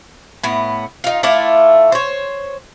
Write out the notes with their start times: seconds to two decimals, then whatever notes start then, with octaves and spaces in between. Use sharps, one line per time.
0.43 A2 B3
1.04 D#4 F4
1.23 A3 E4 F4 D5
1.92 C5 C#5